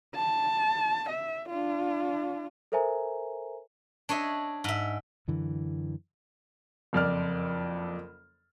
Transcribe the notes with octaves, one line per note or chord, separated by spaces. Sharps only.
A5
E5
D4 F4
A4 A#4 C5 E5 G#5 A#5
D4 C#5 D#5 E5
G#2 E5
F#2 D3 E3
F#1 F2 D5 F6